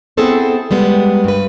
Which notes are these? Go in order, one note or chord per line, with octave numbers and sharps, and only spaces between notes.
B3 C4 E4 G#4 A4 C5
G3 G#3 B3
G2 B4